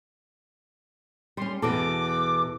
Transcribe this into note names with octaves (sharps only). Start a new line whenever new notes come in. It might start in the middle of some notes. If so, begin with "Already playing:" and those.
G3 C#4 C6
E2 B2 A4 D6